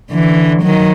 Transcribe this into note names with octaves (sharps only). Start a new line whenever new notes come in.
D3 E3
D#3 F#3